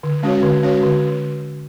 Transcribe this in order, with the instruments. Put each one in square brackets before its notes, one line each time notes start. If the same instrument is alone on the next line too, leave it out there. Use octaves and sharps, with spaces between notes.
[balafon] D3
G#3 C#4 F#4 C#5
D3
G#3 C#4 F#4 C#5
D3